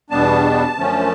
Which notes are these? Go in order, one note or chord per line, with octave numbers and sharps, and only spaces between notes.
E2 B2 G3 B3 D4 A5
F#2 D3 F3 A3 C#4